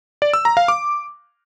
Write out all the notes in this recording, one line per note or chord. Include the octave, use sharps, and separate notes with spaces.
D5
E6
A#5
F5
D6